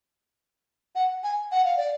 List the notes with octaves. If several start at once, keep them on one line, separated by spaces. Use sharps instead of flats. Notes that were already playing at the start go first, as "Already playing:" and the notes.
F#5
G#5
F#5
F5
D5